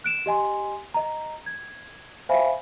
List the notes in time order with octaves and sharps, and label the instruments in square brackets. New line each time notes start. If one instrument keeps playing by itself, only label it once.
[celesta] F#6 D7 E7
G4 D#5 G#5 C6
D#5 A#5
G#6
C5 E5 F5 G#5 B5